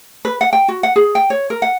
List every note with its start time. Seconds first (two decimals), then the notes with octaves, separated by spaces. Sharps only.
0.25 B4
0.41 F#5
0.53 G5
0.68 F#4
0.83 F#5
0.96 G#4
1.15 G5
1.30 C#5
1.50 A#4
1.62 F#5